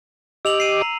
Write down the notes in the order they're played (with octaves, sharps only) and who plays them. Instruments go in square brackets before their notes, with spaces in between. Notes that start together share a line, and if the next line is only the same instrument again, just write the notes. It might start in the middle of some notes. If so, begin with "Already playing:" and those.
[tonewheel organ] G4 D#5 D6 [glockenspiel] E6 F7 F#7
[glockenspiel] C7 D#7
A#5